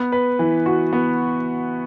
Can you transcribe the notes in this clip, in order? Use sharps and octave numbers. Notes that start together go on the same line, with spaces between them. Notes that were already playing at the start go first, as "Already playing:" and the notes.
Already playing: B3
B4
E3
F#4
B3